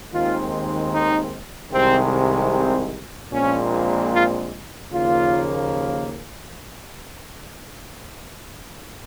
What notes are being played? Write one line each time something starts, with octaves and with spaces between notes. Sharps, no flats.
D#2 D#3 G#3 C4 F4
D#4
C2 C3 D#3 G#3 C4
C4
A#1 A#2 G#3 C4 C#4
F4
D#2 C#3 F3 A#3 F4